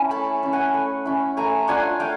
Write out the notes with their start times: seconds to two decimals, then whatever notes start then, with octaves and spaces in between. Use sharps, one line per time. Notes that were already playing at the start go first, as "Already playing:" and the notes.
Already playing: C#4 E4
0.11 A3 A5 B5
0.43 C#4 E4
0.53 F#5 G#5
0.74 A3
1.05 C#4 E4
1.37 A3 G#5 A#5
1.68 D4 F4 F#5 G#5
2.00 A3 F5 G5